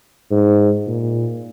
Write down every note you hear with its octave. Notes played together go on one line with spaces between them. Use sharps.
G#2
A#2